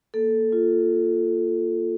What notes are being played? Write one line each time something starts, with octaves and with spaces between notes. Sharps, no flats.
A#3 A4
F4